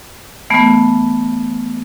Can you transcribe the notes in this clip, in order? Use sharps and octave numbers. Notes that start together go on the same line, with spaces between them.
E3 A3 B3